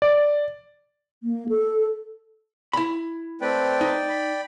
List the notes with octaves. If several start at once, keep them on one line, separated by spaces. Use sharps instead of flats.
D5
A#3
A4
E4 B5
A3 C4 B4 D5 G5
D#4
B5